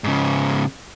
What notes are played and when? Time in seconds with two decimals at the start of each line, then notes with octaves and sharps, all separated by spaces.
0.04 G#2 C#3